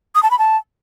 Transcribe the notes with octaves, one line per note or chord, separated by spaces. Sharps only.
D#6
A5
B5
A5